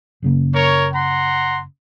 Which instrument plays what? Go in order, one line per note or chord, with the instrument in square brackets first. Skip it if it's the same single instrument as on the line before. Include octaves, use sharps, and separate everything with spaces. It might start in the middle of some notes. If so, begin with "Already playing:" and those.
[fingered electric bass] F#1 C#3 A#3
[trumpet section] A#4 C#5
F#5 A#5 C6